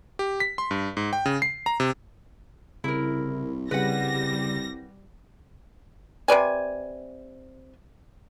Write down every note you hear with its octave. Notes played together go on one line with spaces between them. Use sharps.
G4
B6
C6
G2
G#2
G5
C#3
C7
A#5
C3
C2 C#3 E4 A#4
C2 C#3 G3 B4 F#5 A#6
C3 B4 D5 G#5